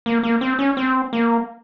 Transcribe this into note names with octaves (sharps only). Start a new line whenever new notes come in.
A#3
A#3
C4
C#4
C4
A#3